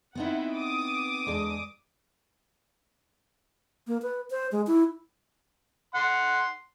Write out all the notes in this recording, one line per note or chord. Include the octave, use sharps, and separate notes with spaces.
B3 C4 D#4 E4 F#5
D6 D#6
E2 G#3 D4
A#3
B4
C5
G#3
E4
F#5 C6